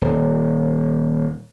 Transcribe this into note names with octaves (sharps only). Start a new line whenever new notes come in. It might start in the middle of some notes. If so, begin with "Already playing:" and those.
D#1